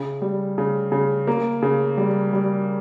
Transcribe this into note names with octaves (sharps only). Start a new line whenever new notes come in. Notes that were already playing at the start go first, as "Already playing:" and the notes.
Already playing: C#3
G3
C#3
C#3
A#3
C#3
G3
G3